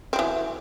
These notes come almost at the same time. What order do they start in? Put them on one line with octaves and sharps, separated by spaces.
C4 F#3 E3